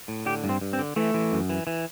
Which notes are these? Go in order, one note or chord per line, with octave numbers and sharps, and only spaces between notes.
A2
D3 G4
G2
C4
G2
C4
D3
E3 A3
E3
F#2
E3
E3